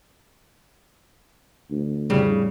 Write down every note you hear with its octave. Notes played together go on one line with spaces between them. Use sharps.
D2
F2 A2 C#3 G3